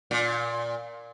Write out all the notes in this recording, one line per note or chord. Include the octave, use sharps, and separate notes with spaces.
A#2